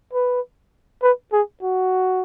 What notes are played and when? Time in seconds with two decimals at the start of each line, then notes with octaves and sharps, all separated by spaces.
0.13 B4
1.03 B4
1.32 G#4
1.62 F#4